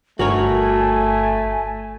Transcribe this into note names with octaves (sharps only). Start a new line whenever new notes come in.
G1 A3 F#4 A#4 C#5 G#5